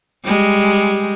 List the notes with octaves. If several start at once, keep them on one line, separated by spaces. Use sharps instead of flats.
G3 G#3